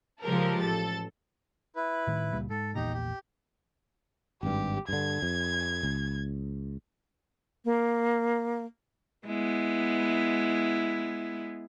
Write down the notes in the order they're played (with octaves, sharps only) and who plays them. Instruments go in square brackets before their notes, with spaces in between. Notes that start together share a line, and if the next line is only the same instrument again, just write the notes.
[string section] C#3 F3 G#3 G4 A4 A#4
A1 A4 A6
[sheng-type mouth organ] E4 B4
[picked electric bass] A2 D#3
C#2 A#2 G3
[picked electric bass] G#2 [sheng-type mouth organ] A4
[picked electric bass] A#1 E2 A#2 [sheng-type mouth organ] D#4 G4 A#5
[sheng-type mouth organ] G4
[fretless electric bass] G#1 G2 [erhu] G4
[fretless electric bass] G2 D3 [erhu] G#6
[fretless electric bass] F2
C#2
[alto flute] A#3
[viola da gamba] G#3 B3 E4